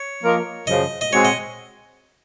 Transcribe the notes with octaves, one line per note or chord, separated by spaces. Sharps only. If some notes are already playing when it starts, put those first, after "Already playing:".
Already playing: C#5
F3 A#3 F4 A#4 D#5
F#2 C#3 F3 D#5
D#5
G#3 C4 F#4 C#5
D#5